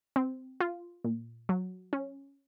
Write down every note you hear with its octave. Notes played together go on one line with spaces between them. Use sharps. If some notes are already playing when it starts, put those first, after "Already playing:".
C4
F4
A#2
F#3
C#4